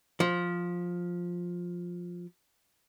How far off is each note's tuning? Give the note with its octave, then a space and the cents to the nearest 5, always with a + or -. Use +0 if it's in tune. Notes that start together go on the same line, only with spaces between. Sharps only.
F3 +10